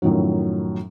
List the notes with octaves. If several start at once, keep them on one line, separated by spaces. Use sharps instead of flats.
F#2 A2 D#3 F3 F#3